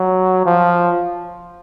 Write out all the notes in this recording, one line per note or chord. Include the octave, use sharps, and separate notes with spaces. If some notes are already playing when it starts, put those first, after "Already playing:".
Already playing: F#3
F3